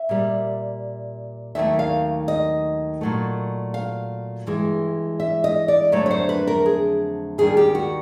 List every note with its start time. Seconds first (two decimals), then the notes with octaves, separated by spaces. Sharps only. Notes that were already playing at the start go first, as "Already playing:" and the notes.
Already playing: E5
0.09 A#2 G3
1.55 D#2 D#3 F#3 A3 E5
1.79 F5
2.28 D#5
3.01 A#2 F#3 A3
3.74 F5
4.47 G2 E3 G#3
5.20 E5
5.44 D#5
5.68 D5
5.92 F2 D3 F#3 A3 C#5
6.06 C#5
6.11 C5
6.29 B4
6.47 A#4
6.66 G#4
7.38 D#2 D#3 G3 G#4
7.57 G4
7.75 F#4